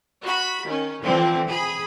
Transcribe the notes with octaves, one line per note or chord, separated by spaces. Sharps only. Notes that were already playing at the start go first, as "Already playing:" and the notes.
F#4 B5
D#3 C#4
D3 E3 F3 C4
G#4 B5